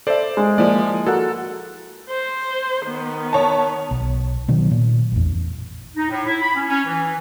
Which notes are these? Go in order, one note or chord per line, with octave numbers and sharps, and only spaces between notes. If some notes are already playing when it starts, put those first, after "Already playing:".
A4 C5 D5 E5
G#3
F3 A#3 E4 D5
F#4 A4 A#4 F#5
C5
D#3 B3
C#5 A5
B1
B2 D#3 F#3
A#2
A1 E2
D#4
A2
E4
B5
C#4
C#4
E3